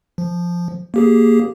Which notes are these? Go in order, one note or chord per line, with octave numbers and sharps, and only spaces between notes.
F3
A#3 G4 G#4